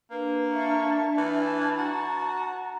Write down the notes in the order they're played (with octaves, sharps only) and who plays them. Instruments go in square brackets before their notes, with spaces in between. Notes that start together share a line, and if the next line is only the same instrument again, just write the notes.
[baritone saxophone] A#3 [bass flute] D4 [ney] B4
[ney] E5 [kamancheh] A5 C#6
[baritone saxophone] E3 [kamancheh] A5
[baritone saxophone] F#4 [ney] A#5